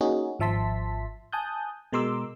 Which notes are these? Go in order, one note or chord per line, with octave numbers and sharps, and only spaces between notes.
A#3 C#4 D#4 F#4 G#4
G#1 F3 E5 A5 C6 B6
G#5 A5 D#6 F#6 G6
B2 G#3 A#4 C6 D6 E6